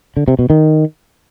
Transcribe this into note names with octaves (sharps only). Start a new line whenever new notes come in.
D3
C3
B2
D#3